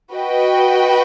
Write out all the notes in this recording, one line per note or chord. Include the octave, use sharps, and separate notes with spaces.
F#4 B4 D#5 G5